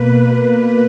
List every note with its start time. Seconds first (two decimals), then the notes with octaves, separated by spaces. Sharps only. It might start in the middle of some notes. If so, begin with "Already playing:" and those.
Already playing: B2 A#3 B4